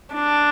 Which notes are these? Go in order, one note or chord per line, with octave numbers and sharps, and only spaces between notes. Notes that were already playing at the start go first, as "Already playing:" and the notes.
D4